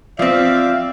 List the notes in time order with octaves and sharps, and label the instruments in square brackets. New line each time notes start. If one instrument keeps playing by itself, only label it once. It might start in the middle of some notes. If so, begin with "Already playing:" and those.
[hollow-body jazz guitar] F3 C4 [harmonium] D5 E5 F5